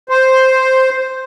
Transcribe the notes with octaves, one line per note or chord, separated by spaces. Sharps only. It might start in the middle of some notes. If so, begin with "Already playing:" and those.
C5